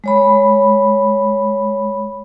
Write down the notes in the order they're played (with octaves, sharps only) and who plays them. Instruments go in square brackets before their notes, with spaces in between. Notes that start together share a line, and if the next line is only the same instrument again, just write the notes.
[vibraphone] G#3 C#5 B5